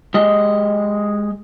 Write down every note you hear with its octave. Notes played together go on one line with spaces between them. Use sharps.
G#3 G4 D#5